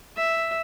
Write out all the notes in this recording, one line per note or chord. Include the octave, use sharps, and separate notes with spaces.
E5